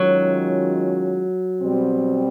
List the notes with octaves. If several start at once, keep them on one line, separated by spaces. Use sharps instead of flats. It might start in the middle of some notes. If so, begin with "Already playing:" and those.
Already playing: D#3 F#3 G#3 C#4 F4
B2 G3 C4